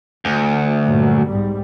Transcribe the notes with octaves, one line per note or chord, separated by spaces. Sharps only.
D2
G2 A#2 F#3
B1 G#2 G3